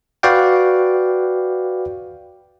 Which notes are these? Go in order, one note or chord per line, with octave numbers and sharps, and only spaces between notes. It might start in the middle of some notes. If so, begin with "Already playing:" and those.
F#4 B4 D5 F5 G5